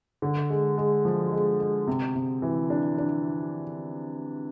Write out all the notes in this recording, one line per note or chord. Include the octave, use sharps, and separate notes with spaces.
D3
G#3
G#3
F3
G#3
G#3
C3
C3
E3
D4
D4